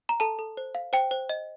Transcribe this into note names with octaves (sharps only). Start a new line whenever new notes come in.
A#5
A4 A5
A4
C5
F5
C5 G5
C5
D#5